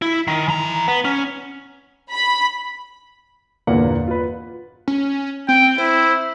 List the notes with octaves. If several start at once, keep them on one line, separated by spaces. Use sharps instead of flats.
E4
D#3
E3 A#5
B3
C#4
B5
G1 E2 A#2 A#3 B4 F#5
F4 B4
C#4
C4 G5
E4 C5